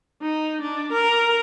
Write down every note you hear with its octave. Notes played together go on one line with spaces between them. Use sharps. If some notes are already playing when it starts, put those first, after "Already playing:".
D#4
D4
A#4